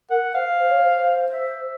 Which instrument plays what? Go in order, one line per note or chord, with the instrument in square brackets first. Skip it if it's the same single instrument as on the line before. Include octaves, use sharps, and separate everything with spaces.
[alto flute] A#4 [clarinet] F#5
[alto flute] C5 [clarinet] F5
[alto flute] C5
C#5
C5
[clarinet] E5